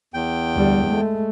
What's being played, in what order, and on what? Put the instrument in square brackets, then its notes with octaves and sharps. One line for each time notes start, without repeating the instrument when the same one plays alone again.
[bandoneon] E2 G5
[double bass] D2 G3
G#3 A3